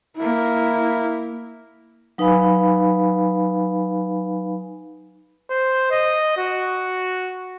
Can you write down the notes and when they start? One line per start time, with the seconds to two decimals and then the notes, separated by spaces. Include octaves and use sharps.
0.17 A#3 E4
2.18 F#3 D#4 B4 F5 G#5 B5
5.51 C5
5.91 D#5
6.38 F#4